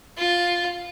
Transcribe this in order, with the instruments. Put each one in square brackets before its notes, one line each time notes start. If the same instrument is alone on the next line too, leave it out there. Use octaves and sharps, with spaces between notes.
[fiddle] F4